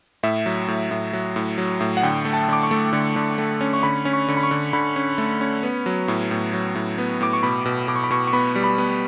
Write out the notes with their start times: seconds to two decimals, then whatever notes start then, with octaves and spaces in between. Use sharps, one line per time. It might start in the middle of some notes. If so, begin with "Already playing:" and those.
0.23 A2 E5
0.46 F#3
0.68 A2
0.91 A2
1.13 F#3
1.36 A2
1.58 F#3
1.81 A2
1.97 F#5
2.03 D3 G5
2.25 A3
2.33 A5
2.48 D3 D6
2.63 C#6
2.71 A3
2.93 D3
3.16 D3
3.38 A3
3.61 C#4
3.73 C#6
3.83 D3 B5
4.05 C#4
4.13 C#6
4.28 D3
4.37 B5
4.43 C#6
4.51 D3
4.73 D3 B5
4.96 C#4
5.18 A3
5.41 C#4
5.63 B3
5.86 F#3
6.08 A2
6.31 A2
6.53 F#3
6.75 A2
6.98 B3
7.21 A2 D6
7.33 C#6
7.43 B2 B5
7.65 B2
7.88 B2 D6
7.96 C#6
8.04 B5
8.11 B2 C#6
8.27 C#6
8.33 B3 B5
8.56 G3
8.64 B5
8.78 B3